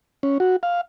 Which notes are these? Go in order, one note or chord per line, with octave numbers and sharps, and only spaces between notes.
C#4
F#4
F5